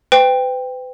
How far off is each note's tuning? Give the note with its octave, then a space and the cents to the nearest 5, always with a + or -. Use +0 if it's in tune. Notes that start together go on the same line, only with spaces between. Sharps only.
B4 +40 G5 +10